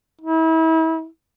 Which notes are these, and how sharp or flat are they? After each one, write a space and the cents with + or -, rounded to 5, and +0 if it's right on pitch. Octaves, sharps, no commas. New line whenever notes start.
E4 -35